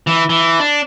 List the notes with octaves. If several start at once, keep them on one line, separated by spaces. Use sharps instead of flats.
E3
E3
D4